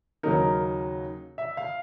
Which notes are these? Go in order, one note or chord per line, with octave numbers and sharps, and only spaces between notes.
D#2 C#3 F#3 A#3 D#4 A#4
E5
F5